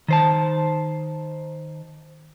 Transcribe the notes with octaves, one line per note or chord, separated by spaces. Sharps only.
D#3 C5 A5